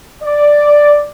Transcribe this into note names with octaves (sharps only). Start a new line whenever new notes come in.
D5